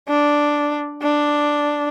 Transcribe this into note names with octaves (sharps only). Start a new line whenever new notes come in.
D4
D4